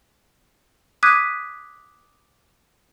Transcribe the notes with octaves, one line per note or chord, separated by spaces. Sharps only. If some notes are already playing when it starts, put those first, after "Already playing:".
D6 D#6 F#6 G#6 B6 D#7